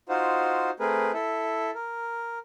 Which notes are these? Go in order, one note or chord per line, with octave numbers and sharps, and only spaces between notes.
D#4 F4 F#4 C5
A3 C4 G#4 A#4 B4
E4 A4 E5
A#4